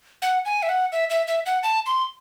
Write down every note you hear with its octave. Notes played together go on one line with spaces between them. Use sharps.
F#5
G#5
E5
F#5
E5
E5
E5
F#5
A5
C6